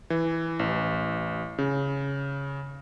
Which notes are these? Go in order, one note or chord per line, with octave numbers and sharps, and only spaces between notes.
E3
A1
C#3